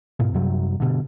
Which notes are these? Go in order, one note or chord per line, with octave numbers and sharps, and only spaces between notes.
G#2 B2
F#2 C3 F#3 G3
G2 B2 D3